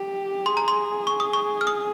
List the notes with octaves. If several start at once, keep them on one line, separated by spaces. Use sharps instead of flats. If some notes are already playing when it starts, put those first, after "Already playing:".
Already playing: G4
G#4 C6
A#5
C6
C#6
D#6
C#6
F6
D#6